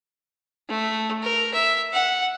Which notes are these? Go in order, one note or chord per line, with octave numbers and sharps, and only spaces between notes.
A3
A#4
E5
F#5